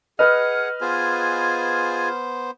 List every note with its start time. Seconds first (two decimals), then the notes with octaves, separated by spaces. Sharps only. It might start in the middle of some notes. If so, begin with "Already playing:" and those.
0.19 G#4 B4 D#5 F#5 F6
0.81 B3 F4 G#4 C5 G#5